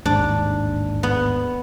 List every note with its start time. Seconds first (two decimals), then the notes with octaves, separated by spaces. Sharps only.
0.05 A1 D#2 G#2 D4
1.03 B3